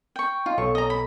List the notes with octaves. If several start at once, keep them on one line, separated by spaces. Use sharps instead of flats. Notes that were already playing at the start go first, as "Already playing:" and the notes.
G5 C#6
D#4 F4
B1 A4 C#5 C#6
D#5 A#5
B5